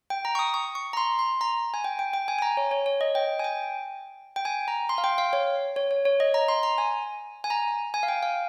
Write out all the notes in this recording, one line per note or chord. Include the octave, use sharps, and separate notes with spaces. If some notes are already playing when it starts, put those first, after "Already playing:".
G5
A#5
C#6
D#6
C#6
C#6
A#5
C6
C6
A#5
G#5
G5
G5
G5
G#5
G#5
A#5
C#5
C#5
C#5
D#5
G5
G#5
G5
G5
G#5
A#5
C6
F5
G5
F5
C#5
C#5
C#5
C#5
D#5
A#5
C6
A#5
G#5
G#5
A#5
G#5
F5
G5
F5